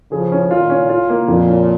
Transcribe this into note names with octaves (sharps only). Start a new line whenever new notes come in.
C#3 F3 G#4
C#4
A#2 D#3 F4
C#4
F4
A#3
F2 A#2
C#4